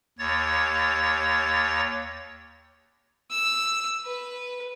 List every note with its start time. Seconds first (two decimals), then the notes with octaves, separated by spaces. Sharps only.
0.19 D#2 C#5 A6
3.31 E6
4.05 B4